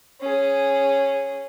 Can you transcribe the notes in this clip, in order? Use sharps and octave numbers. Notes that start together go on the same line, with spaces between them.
C#4 G#4